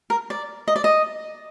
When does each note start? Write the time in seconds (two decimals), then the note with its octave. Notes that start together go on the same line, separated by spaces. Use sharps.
0.10 A#4
0.30 D5
0.68 D#5
0.76 D5
0.84 D#5